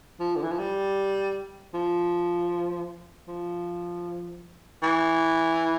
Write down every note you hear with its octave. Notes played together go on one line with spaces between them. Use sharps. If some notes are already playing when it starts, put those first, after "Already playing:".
F3
D3
E3
F3
G3
F3
F3
E3